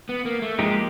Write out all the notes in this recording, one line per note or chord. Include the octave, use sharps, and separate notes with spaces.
B3
A#3
A3
F3 G#3 A#3 D#4 G4